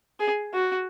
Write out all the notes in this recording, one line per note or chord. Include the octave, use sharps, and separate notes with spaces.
G#4
F#4